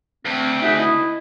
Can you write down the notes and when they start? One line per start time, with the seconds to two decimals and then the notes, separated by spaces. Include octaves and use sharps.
0.25 D2 C4
0.62 D#4 F#4 G#4 E5
0.79 E4 D#5